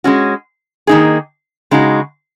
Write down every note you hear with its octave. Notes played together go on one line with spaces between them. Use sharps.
G#3 C#4 F#4
D#3 A#3 D#4 G#4
C#3 G#3 D#4 F#4